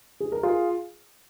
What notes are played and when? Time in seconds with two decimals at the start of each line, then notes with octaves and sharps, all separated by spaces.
0.20 G#4
0.32 A#4
0.43 F4 G#4